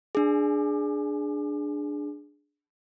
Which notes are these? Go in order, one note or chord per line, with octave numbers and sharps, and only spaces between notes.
D4 G#4